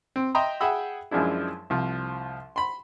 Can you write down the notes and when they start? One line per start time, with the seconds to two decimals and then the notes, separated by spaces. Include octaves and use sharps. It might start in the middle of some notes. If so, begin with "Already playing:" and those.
0.16 C4
0.35 D#5 E5 G5 A#5 C6 D#6
0.61 G#4 E5 F#5 G5 B5 E6
1.11 F#2 F3 G#3 D4 E4
1.70 C2 F3
2.56 B5 C6